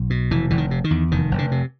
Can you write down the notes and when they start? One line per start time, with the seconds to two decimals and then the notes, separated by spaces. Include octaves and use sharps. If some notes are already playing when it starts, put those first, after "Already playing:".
Already playing: B1
0.10 B2
0.31 F1 E3
0.50 F1 E3
0.58 D#3
0.71 C3
0.84 D#3
0.91 E2
1.11 F1 D#3
1.31 F1
1.38 D3
1.51 C3